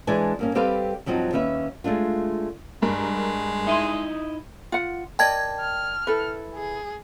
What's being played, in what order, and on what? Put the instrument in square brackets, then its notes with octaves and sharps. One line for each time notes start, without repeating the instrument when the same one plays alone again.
[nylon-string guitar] E3 G#3 D4 B4 G#5 A5
G2 A#3 C#4
G3 C4 G4 A4 B4 F5
G2 F3 F#3 C4 D#4
D#2 C#4 B4 E5
G#3 A3 D4 F4
[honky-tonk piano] G2 A#4 [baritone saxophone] G#3
[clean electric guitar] D#4 E4 D#5 [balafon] E5 C6
[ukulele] F4 F#5
[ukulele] A#4 D5 D#5 [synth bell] G5 A5 G#6
[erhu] F6
[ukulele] E4 A4 B4
[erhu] G#4